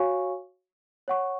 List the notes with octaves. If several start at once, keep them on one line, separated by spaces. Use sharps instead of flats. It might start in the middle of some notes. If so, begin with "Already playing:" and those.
Already playing: F#4 C#5 F5 G#5 C#6
C#5 F#5 C#6